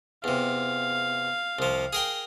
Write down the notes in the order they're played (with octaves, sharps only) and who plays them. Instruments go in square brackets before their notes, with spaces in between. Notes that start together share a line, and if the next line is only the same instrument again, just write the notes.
[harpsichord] E2 C3 [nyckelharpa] F5
[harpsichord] C2 F3
G#4 A#4 G5